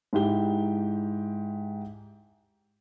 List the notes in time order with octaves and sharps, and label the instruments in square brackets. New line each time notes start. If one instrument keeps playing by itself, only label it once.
[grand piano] G#2 E4 G4 G7